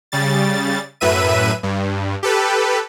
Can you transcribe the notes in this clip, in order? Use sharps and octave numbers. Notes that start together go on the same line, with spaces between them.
C#3 G3 A6
F#2 A2 B4 E5 D#7
G2
G4 A4 B4